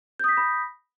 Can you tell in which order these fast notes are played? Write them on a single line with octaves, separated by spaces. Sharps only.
G6 D#6 B6 A#6 B5